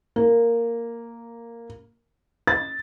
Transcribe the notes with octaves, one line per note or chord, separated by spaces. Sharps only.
A#3
A6